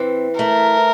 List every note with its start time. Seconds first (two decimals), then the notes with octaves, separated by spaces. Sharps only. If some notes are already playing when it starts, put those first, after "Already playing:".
Already playing: E3 C4
0.39 A3 A#4